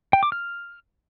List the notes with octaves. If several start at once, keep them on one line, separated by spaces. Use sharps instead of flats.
G5
D6
F6